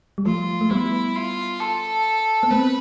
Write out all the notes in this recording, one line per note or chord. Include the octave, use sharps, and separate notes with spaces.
G3
F3 A3 F4
A3
G3 B3 E4
F4
A4
B3
A3 C4 B4